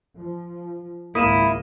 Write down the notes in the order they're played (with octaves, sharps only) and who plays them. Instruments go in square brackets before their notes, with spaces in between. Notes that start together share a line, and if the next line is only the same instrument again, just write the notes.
[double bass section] F3
[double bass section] G#1 C#2 [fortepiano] A#3 [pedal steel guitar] E4 [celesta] D#6 D#7 E7